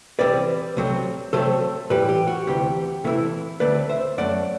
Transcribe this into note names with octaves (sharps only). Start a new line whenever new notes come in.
C2 C3 E3 G3 C4 B4 D5
C2 C3 F#3 A3 C4
C3 F#3 A3 C4 A4 C5
A2 E3 G3 G4 B4
G4
F#4
D2 C3 E3 G4
C3 E3 A3 C4 E4
D2 D3 A3 C4 B4 D5
C5 E5
F#2 F#3 A3 D5 F#5